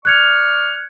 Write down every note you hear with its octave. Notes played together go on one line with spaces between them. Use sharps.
D5 C#6 F6 F#6 G#6 C#7